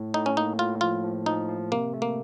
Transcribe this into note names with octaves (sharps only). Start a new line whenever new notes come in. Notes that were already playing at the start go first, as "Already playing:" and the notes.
Already playing: A2
A2 D#4
C#4
A#3 D#4
A2 F4
F3 F4
F3
F3 D#4
F3
C3 A#3
A3
A#3